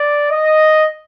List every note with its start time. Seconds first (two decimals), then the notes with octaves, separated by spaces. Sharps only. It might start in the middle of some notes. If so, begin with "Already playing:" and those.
Already playing: D5
0.31 D#5